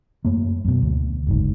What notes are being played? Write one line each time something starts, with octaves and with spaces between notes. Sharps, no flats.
F#2 A3 A#3
F#2 B2
D2
F#1 G#2